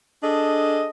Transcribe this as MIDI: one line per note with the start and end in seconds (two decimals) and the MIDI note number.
0.23 0.89 62
0.23 0.89 68
0.23 0.89 69
0.23 0.89 75